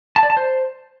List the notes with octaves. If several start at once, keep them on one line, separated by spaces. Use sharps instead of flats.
A5
D5
A5
C5